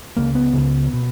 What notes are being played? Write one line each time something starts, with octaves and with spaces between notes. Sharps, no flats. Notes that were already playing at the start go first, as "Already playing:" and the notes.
C#2 C#3 A#3
B3
C#2 C#3
B2